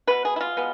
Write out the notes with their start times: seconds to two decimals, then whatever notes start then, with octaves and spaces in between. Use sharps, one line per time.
0.07 B2 G#3 B3 B4
0.25 G#4
0.36 E4
0.41 F4
0.57 B2 G#3 B3